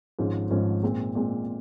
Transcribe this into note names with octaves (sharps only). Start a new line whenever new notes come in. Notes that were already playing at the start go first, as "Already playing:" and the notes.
G#1 G#2 F3 G#3 C#4
G#1 G#2 F3 G#3 C#4
A#2 G#3 C4
A#2 G#3 C4